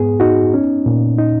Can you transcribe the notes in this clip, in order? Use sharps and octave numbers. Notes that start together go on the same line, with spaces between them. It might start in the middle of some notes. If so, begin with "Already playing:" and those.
Already playing: G#2 B3 G#4
D#4 F#4
C#4
A#2
D#4